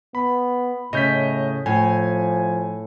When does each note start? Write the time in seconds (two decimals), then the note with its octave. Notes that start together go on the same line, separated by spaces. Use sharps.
0.15 B3 B5
0.93 A2 C#3 D#5 G6 B6
1.66 A2 F3 G#5